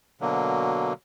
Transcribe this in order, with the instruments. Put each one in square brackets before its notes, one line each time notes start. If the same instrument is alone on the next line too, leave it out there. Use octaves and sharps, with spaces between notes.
[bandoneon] B2 D3 F#3 A#3